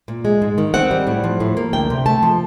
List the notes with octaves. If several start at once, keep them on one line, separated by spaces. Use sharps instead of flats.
A#2
G#3
G#2
D#3
C4 F#5
G3
A2
F3
A2
A#3
D2 G5
C3
A3 A5
F3